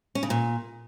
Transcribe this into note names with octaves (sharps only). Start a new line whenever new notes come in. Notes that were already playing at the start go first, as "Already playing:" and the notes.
C#4
C#3
A#2